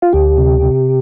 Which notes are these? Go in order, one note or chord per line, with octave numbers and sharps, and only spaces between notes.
F4
D2 G4
C3
C3